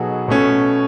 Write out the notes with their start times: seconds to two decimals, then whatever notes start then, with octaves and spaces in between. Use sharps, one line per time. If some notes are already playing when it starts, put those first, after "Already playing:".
Already playing: B2 F#3 B3 D#4 F#4 G#4 A4
0.28 B2 A3 C#4